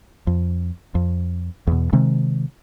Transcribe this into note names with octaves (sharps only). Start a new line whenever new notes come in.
F2
F2
E2 B2
C3 D#3 G#3